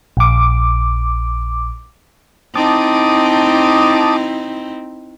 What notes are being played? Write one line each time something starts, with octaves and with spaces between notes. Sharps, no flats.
A#1 D6
C4 D#4 E4 A5 D6 D#6